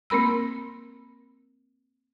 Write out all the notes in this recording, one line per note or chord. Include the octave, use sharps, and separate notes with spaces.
A#3 C4 A#4 B5 E6